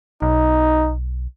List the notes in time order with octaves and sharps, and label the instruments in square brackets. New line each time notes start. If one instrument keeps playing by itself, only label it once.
[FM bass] B1 [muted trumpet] D#4